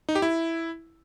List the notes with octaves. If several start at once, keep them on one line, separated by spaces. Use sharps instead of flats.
D#4
G4
E4